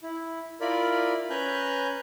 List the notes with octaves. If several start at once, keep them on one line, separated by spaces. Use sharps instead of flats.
E4
E4 F4 A#4 D5 B5
C#4 B4 G#5 A#5 F#6 G6